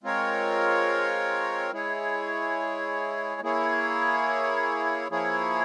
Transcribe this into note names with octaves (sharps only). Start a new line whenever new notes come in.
G#3 C4 F4 A#4 C#5
G#3 E4 G#4 C#5
A#3 E4 G#4 C#5
F3 A#3 E4 G#4 C#5